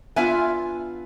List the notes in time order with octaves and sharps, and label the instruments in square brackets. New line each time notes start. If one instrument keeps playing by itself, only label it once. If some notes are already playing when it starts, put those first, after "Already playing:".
[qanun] B3 D4 F4 [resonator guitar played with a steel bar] E5 G#5